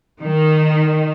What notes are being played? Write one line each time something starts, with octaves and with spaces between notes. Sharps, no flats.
D#3